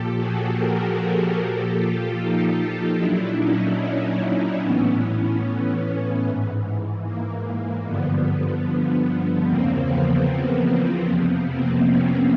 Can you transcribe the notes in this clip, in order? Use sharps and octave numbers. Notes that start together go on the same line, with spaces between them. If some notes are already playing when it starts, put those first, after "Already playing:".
Already playing: A#2 F3 G4 A4
F#4 G#4
G#4 A#4
A#2 F3 G4 A4
F4 G4
D#4 F4
A#2 F#3 D4 E4
C#4 D#4
C#4 D#4
A2 E3 B3 C#4
B3
G#2 E3
A#3
G2 D3 F3 B3
E2 C#3 F3 A#3 C4
B3
A#3
B3
F2 C3 F3 B3
A#3 C4
B3 C#4